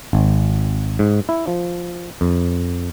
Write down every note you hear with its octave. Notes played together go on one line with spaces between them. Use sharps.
G#1
G#2
E4
F3
F2